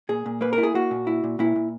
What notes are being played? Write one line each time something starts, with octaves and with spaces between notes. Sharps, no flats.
A#2 G#4
A#2
A#3 B4
A#4
E4
G#4
A#3 F#4
A#2
E4
A#2
A#2 E4
A#2